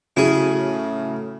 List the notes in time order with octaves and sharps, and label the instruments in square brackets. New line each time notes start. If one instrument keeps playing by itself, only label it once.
[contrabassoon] A2 [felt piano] C#3 F#3 [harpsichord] E4 G#4